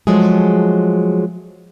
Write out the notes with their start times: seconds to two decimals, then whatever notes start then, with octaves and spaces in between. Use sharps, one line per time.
0.07 F3 F#3 G#3 A3 G#4